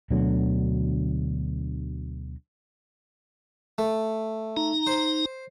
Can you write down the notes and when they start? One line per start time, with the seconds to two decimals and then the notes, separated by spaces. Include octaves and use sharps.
0.11 D2 B2 D3 F#3
3.78 A3
4.57 D#4 A#5
4.87 C5